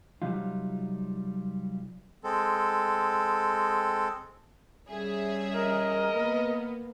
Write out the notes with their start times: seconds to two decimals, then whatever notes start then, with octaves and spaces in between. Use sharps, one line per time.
0.22 C3 F#3 G3 D#4 F4
2.24 G#3 C4 A4
4.89 G3 C#4 G#4 E5
5.54 A#4 D#5
6.12 A#3 B3